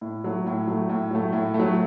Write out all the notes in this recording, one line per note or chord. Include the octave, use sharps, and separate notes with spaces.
A2
F#3 A3
A2
F#3 A3
A2
F#3 A3
A2
A3
F#3